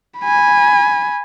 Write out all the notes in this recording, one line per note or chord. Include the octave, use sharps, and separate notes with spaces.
G#5 B5